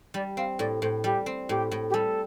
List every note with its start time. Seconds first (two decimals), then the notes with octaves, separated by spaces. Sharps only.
0.14 G3 D5
0.37 C4 F5
0.59 A2 D5
0.81 A2 C5
1.04 G3 G4
1.26 C4
1.49 A2 G4
1.71 A2
1.90 G4
1.94 G3 A4